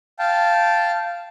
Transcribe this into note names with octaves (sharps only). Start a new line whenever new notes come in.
F5 G5 A5